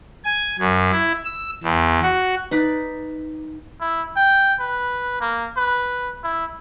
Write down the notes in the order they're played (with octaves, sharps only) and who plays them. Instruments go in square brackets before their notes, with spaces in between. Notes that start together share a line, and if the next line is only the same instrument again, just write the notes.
[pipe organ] G#5
F#2
E4
E6
E2
F#4
[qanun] D#4 B4 D5
[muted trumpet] E4
G5
B4
A#3
B4
E4